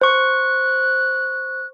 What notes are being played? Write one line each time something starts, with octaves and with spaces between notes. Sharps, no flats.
C5 C#6 F#6